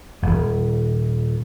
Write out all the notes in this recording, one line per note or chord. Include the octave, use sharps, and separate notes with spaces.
D#1 G#1